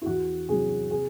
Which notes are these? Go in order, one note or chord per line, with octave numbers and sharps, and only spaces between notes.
E4
E2 F#4
C3 F#3 G#4
C3 G#4